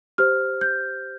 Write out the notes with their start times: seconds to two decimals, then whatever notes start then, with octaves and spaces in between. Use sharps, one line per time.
0.18 G4 C5 F6
0.61 G6